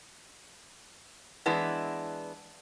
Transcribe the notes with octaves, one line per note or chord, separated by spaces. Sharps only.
E3 G#3 B3 D4 E4